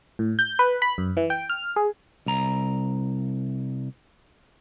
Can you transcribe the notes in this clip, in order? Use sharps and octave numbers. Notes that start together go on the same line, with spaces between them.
A2
G6
B4
B5
F#2
E3
G5
F6
G#4
C2 A#5